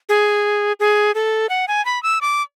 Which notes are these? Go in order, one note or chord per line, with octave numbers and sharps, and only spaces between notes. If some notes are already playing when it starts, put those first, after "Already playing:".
G#4
G#4
A4
F#5
G#5
B5
E6
D6